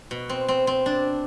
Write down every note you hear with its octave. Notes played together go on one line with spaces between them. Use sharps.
B2
C4
C4
C4
D4